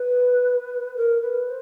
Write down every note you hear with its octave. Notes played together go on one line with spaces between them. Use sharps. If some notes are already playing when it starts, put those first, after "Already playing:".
Already playing: B4
A#4
B4
C5